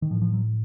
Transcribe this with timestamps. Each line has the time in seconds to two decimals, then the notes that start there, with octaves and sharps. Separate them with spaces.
0.02 D#3
0.10 A2 F3
0.22 F3
0.33 F#3